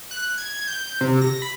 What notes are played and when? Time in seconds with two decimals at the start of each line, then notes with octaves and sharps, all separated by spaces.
0.11 F#6
0.38 G#6
0.68 G6
1.01 C3
1.22 A#6
1.42 B5